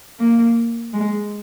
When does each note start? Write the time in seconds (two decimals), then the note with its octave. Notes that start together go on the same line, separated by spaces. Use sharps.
0.19 A#3
0.94 G#3